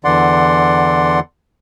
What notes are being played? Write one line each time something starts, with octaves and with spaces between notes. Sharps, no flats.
E2 D3 E3 D5 F#5 C6